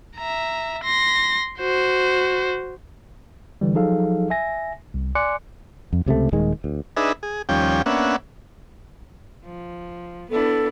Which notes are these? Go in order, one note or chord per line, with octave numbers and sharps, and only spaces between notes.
E5 A#5
C6 A#6
F#4 C5
D3 E3 G3
F3 F#3 D#4 G#4 A4 F5
E5 G#5 A#6
C2
D5 G#5 C6 D6 F#6 C#7
F2
C#2 C3 F#3 A3
D#1 D#3 G#3
D2
D4 D#4 G#4 B4 E5
G#4
D#2 F3 G3 C#4 G5
A#3 B3 C#4 D4 E5 F#5
F3
B3 D4 E4 A4